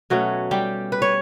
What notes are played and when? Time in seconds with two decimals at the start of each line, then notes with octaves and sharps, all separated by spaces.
0.10 B2 F#3 A3 C#4 F#4
0.51 G3 G4
0.92 B4
1.02 C#5